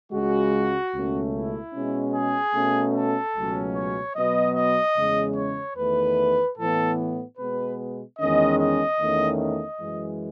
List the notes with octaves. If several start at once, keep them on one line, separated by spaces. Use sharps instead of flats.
C#2 C#3 G#3 F#4
C#2 B2 A3 C#4
E4
B2 G#3 C#4
G#4
B2 A3 C#4
A4
C#2 B2 F#3 A3 C#4
C#5
B2 F#3 B3 D#5
D#5
E2 C#3 G#3 C#4
C#5
E2 D#3 A3 B4
A2 E3 B3 A4
B2 G#3 B3 B4
E2 D#3 G#3 C#4 D#5
D#5
E2 D#3 A3 C#4
D#5
F#2 E3 G#3